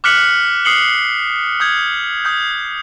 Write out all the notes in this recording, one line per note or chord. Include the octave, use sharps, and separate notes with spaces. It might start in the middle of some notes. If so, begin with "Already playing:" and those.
D6 F6 F#6 B6 C#7 F#7
D#6 C7 C#7 F#7 G7
D#6 G6 G#6
D#6 G6